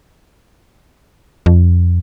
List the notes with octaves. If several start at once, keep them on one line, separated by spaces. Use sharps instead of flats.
F2